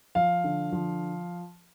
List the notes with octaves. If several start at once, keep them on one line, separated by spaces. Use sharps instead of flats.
F3 F5
D3
F3